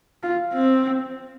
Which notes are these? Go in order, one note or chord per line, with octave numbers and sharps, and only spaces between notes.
F4
C4